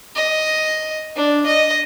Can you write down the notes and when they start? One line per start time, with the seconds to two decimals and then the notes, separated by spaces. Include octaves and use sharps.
0.16 D#5
1.16 D4
1.46 D#5